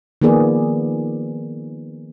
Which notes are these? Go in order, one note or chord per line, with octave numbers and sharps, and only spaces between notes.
D#3 F3 A#3 B3 G#4 D5